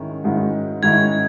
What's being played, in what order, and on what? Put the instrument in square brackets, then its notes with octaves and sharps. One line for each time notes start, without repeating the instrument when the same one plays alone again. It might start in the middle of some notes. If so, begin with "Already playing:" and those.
Already playing: [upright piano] G#2 D#3 G#3 C#4 E4
G#2 D#3 G#3 C#4 E4
[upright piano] G#2 D#3 G#3 C#4 E4 [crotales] G#6